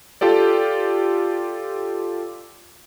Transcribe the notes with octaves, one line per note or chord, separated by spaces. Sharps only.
F4 G4 A4 D5